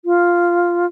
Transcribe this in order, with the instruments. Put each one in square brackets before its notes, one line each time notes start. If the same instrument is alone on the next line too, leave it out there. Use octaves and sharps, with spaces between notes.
[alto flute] F4